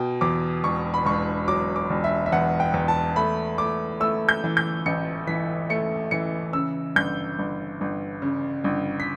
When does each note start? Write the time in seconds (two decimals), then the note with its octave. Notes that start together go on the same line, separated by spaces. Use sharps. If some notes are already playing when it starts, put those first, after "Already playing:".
Already playing: B2 G5
0.21 E2 D6
0.63 E1 C#6
0.94 B5
1.05 E1 C#6
1.48 F#3 D6
1.76 D6
1.90 E1
2.04 E5
2.26 E5
2.32 E2 F#5
2.60 G5
2.74 E2
2.88 A5
3.16 A3 B5
3.58 A3 D6
4.00 A3 E6
4.29 G6
4.44 E3
4.57 G6
4.86 A1 C#7
5.27 E3 B6
5.70 A3 C#7
6.11 E3 C#7
6.53 C#3 E6
6.96 G1 G6
7.39 G1
7.81 G1
8.22 C#3
8.64 G1
9.00 B6